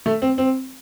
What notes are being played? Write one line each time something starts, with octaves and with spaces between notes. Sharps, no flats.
A3
C4
C4